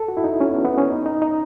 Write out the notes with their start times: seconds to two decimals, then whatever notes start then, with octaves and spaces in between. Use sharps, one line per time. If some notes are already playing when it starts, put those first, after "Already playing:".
Already playing: A4
0.08 F#4
0.17 E4
0.24 D#4
0.41 C#4
0.53 B3
0.65 B3
0.78 C#4
0.90 D#4
1.06 D#4
1.22 D#4